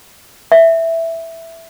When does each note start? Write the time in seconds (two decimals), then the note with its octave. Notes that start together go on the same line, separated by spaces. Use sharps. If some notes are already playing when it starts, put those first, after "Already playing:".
0.52 E5